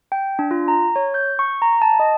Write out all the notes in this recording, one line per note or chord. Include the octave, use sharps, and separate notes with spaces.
G5
D4
F4
A#5
C#5
G6
C#6
A#5
A5
D#5